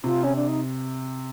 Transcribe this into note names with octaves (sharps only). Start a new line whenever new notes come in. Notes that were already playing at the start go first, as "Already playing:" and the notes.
C3 F4
C#4
D4
D#4